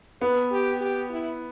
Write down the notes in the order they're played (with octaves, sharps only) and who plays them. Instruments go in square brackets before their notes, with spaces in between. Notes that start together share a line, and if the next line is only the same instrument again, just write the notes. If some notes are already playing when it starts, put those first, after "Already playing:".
[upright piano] B3 [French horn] B4
[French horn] G4
G4
E4